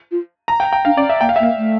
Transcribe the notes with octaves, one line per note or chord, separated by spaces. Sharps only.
F4
A#5
G5
G5
D4 F5
C#4 D5
E5
A#3 G5
F5
E5
A#3
F5
A3